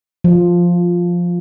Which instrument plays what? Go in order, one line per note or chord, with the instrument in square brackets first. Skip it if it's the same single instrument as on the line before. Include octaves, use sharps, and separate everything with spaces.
[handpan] F3